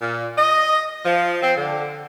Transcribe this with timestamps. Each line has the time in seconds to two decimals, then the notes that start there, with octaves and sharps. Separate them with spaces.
0.01 A#2
0.37 D#5
1.05 F3
1.42 C4
1.56 D3